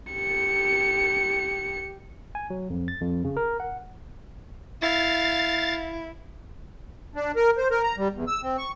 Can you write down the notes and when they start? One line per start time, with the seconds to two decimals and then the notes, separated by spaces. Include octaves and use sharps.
0.13 G4 C#7
2.35 G#5
2.50 F#3
2.70 F2
2.88 A6
3.01 F2
3.24 C#3
3.37 A#4
3.60 F#5
4.82 E4 F5 A6
7.15 D4
7.36 A#4
7.58 C5
7.71 A#4
7.83 A#5
7.97 G3
8.14 E2
8.27 E6
8.43 C4
8.58 C#6